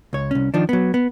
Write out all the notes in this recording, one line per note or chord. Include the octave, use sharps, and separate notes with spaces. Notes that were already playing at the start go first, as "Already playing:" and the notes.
C#2 C#5
C2 C#4
D#3 F3 D4
F#3 B3
B3